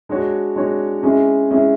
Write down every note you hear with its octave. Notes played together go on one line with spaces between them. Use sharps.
G#3 D4 F#4 C#5
G#3 D4 F#4 C#5
G#3 C#4 E4 G#4
G#3 C#4 E4 G#4